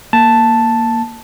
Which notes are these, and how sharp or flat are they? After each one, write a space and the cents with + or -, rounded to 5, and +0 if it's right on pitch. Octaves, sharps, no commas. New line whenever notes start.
A#3 +0 A5 +0